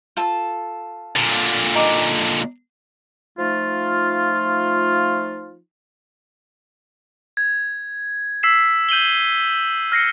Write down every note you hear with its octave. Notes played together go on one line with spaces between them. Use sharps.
F4 A4
A#2 D3
D#4 D6
F3 A3 D#4 F4
G#6
E6 B6 C7 E7
G6 D#7 F#7 G7
F6 A#6 C7 C#7